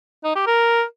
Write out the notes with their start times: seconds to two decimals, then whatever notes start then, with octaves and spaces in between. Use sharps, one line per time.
0.24 D#4
0.35 G4
0.47 A#4